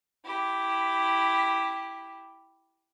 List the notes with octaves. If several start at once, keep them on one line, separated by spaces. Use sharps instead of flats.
E4 G4